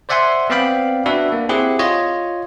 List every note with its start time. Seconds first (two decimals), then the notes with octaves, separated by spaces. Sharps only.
0.09 C5 D5 E5 F#5 G#5 C6
0.50 B3 C4 D5 F5 G5 B5
1.06 D4 F#4 B4 E5
1.32 A#3
1.49 C4 E4 G4 G#4 F#5
1.79 F4 C#5 D#5